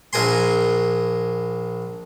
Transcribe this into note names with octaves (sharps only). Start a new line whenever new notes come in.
A#1 A#4 G#5 C6